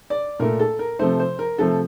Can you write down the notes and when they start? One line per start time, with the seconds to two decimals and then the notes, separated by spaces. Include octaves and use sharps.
0.10 D5
0.40 A#2 A3 A#4
0.59 A4
0.79 A#4
0.99 C3 F3 A3 C5
1.20 C5
1.39 A#4
1.58 C3 F3 A3 A4